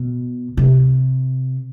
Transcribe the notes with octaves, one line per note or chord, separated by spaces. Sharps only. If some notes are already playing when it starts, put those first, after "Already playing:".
Already playing: B2
C3